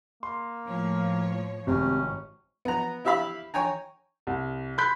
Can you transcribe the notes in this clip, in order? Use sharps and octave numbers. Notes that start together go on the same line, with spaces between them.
A#3 C6
A2 F3 C#5
G#1 C3 C#4
B3 A#5
E4 G4 E5 F5 B5 E6
C#5 G5 G#5 A#5
C2
B5 C6 F#6 G6 B6